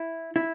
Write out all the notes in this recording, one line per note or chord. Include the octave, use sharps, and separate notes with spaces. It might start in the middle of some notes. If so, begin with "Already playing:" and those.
Already playing: E4
E4